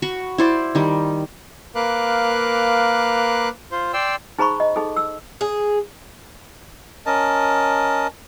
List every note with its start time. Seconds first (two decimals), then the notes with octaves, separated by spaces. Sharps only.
0.02 F#4 B5 C#6
0.38 E4 C5 D5
0.75 D#3 G3
1.75 A#3 A#4 B4 F5 D6 F#6
3.72 F4 C5
3.93 D5 G5 C6 E6
4.39 D#4 G#4 C5 A#5 B5 C#6
4.60 D#5
4.76 D#4 G#4 A4
4.97 E6
5.41 G#4
7.06 C#4 A#4 D#5 A5